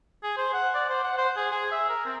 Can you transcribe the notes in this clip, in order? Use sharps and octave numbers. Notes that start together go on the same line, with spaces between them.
G#4
C5
F#5
D5
C5
F#5
C5
G#4
G#4
E5
A#4
C4